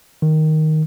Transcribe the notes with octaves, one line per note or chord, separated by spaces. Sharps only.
D#3